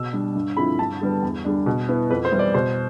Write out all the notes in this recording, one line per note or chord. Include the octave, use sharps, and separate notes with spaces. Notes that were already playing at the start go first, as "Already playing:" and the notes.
Already playing: B2 E6
G3 D4
G2
D3 F3 C4 E4 B5
G2 A5
D3 G3 B3
E2
D3 G3 D4
B2
B3 E4
F2 B4
C5
E3 G3 B3 E4
D5
B2 C5